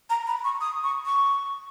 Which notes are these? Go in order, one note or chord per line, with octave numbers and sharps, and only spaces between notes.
A#5
B5
C#6
D#6
C#6
C#6